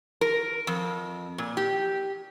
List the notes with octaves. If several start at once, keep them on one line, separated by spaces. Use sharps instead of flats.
A#4
F2
A#2
G4